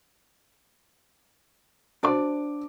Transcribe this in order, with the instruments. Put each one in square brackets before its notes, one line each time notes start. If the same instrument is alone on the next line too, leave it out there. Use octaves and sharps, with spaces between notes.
[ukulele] D4 D5 [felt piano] F#4 C5 D6